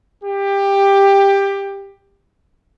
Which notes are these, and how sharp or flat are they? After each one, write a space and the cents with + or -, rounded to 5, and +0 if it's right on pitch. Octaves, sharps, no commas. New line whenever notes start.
G4 +15